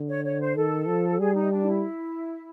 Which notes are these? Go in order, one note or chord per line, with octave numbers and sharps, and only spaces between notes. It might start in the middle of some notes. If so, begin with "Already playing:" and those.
Already playing: D3
C#5
C#5
C5
D#3 A4
F3
G3 G#4
D#4
D4
D#4
E4